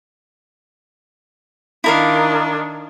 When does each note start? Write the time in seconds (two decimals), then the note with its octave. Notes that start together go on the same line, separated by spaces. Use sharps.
1.84 D#3 D4 E4 A#4 F5